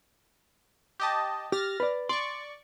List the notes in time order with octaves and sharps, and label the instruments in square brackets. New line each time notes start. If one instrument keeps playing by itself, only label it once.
[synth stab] G4 D#5 A5
[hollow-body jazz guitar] G4 [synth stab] F6 A6 A#6
[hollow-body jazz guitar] B4 D5
[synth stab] D5 C#6 [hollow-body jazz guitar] C6